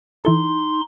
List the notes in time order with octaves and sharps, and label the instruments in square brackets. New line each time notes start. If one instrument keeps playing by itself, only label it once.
[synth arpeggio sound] E3 E4 A4 [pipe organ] D#4 C6